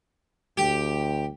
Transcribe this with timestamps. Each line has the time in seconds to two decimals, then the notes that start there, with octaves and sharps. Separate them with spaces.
0.57 D2 G4